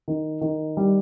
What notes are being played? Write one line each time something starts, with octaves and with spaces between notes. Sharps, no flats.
D#3
D#3
G3